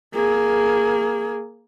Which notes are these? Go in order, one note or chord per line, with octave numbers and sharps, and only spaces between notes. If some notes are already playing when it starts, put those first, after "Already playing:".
A#3 G#4